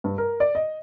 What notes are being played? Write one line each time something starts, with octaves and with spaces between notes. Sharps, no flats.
G2
A#4
D5
D#5